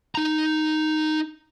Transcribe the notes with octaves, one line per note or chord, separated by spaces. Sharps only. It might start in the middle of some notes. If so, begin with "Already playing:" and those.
D#4 A#5